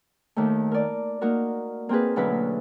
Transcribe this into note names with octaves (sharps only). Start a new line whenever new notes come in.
D#2 D#3 A3
A#4 D5
A#3 D#4 F#4 A#4
A#3 C4 F4 G#4 B4
D2 B2 F#3 E4 B4 B5